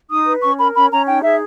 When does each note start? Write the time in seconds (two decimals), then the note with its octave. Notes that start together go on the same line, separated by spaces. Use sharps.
0.10 D#4 D#6
0.26 B4
0.42 C#4 C#6
0.58 A#4 B5
0.75 C#4 B5
0.91 C#4 A#5
1.07 D#4 G5
1.23 G#4 E5